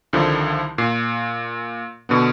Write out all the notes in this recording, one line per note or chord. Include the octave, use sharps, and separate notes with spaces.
C2 D3 D#3 F3
A#2 C7
B2 D3 B3